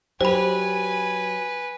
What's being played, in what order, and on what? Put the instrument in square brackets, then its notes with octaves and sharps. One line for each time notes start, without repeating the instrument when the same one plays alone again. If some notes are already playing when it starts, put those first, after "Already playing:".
[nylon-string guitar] F#3 D#4 G4 [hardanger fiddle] B4 G#5 [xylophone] C5 B5